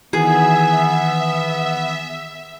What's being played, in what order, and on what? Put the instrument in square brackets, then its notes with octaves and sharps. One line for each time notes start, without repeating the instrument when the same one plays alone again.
[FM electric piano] D#3 E3 [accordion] B3 [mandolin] G#4 [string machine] E5